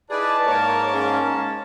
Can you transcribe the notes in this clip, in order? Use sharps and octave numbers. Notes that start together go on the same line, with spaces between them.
D#4 E4 G#4 B4 D5 A5
G#2 A#3 A#4 C#5
G#3 C#4